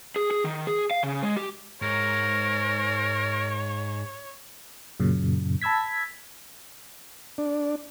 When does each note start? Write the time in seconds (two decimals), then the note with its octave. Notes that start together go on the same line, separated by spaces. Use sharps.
0.16 G#4
0.31 G#4
0.44 D#3
0.67 G#4
0.91 F5
1.03 C#3
1.23 G#3
1.36 G4
1.82 G#2 A#4 C#5
5.00 F#2 A#2 C#3
5.61 A5 B5 E6 G#6 B6
7.38 D4